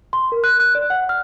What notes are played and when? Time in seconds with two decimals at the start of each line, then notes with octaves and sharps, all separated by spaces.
0.13 C6
0.32 A#4
0.44 F#6
0.60 F#6
0.75 D5
0.90 F#5
1.09 F6